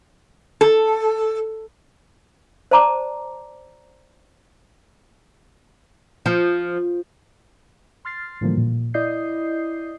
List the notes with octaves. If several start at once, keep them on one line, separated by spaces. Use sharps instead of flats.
A4
C5 D5 A5 A#5 D6
F3
C6 F6 A6 C7
A2 D3 E3 F3 G3 A#3
A#2
E4 D5 D#5 D#6 G6 C7